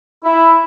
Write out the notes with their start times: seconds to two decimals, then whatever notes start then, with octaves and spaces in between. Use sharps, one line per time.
0.24 E4